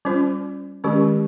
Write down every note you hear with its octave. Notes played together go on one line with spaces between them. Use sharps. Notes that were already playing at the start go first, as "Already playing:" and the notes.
G3 C#4 F4 C5
D#3 G#3 C#4 G4